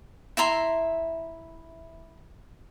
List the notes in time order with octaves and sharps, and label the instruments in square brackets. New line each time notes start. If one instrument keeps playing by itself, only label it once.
[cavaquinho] E4 E5 A#5 C6